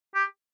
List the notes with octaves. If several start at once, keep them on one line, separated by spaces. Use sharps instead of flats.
G4